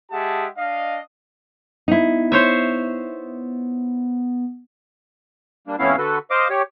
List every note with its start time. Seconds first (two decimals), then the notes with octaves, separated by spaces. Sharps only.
0.12 G#3 G4 G#4 E5 F#5 A5
0.58 D4 D#5 F5
1.88 B3 D#4 E4
2.32 C5 C#5 E5
5.67 G3 A#3 D4
5.79 F2 A2 B3 C#4 E4 F5
5.98 D3 F#4 A4 B4
6.31 C5 D#5 F5 D6
6.50 G4 C#5